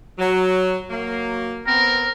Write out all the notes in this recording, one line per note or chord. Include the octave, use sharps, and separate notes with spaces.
F#3
F#3 A#3
B3 C4 A#4